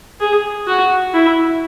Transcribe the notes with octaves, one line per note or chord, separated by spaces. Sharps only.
G#4
F#4
E4